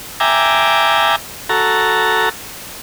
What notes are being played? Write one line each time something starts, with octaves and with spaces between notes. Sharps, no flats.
E5 G5 G#5 A#5 D6
F#4 A4 A#5